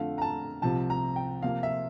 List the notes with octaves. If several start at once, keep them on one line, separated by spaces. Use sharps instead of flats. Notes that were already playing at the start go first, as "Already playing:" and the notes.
Already playing: F2 D3 A3 F5
A#5
A5
C2 C3 F3 A5
A#5
G5
C3 F3 A#3 F4 F5
E5